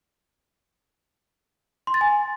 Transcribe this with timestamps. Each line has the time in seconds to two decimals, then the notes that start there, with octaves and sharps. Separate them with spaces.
1.87 C6
1.94 A6
2.01 G#5